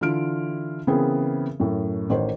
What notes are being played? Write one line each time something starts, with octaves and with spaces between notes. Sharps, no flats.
D3 E3 F4 F6 D7
C#3 E3 B3 C4 G#4 A#4
F#2 A2
A1 D#3 C5